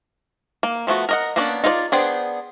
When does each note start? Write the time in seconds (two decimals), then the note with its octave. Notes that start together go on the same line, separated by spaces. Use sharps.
0.63 A#3
0.87 F3 A3 B3 F#4
1.09 A#4 D#5 F#5
1.36 A#3 B3 C#4 D4 D5
1.64 D#4 F4 G#4 B4 D5
1.92 B3 D4 G#4 C5 G5